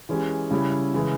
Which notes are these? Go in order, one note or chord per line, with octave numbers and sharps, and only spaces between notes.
E3 G#3 C#4 G4
C#3 G3 C#4 E4
C#3 E3 G#3